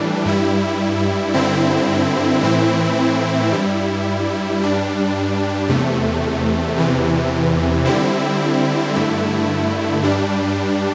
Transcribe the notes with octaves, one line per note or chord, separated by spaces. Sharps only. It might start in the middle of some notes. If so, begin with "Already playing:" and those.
Already playing: A2 E3 G3 D4
G2 G3 E4
G2 D3 C4 E4
A2 E3 C4 E4
G2 G3 E4
G2 G3 D4
E2 C3 A3
E2 C3 E3
D3 G3 C4 E4
G2 D3 A3 E4
G2 G3 D4